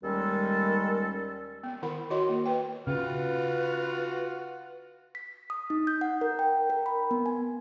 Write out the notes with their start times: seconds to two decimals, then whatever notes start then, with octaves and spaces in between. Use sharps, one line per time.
0.03 D#2 D#3 G3 G#3 C#4 A4
1.64 B3
1.82 D#3 E4 A#4 F#5 B5
2.10 E4 F#4 A#4 C#5 D#5 C6
2.29 A#3
2.46 B4 G5
2.87 C#3 F4 F#4 B4
5.15 B6
5.50 D#6
5.70 D#4
5.87 G6
6.01 F#5
6.21 A#4
6.39 G5
6.70 A#4
6.86 B5
7.11 B3
7.26 G#5